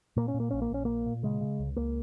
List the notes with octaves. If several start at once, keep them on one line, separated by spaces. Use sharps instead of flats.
A#2 A#3
C#4
A#2
A#3
A#1 C#4
A#3
A#1 C#4
A#2 A#3
A#2
C#3 G#3
C#3
C#2
C#2 A#3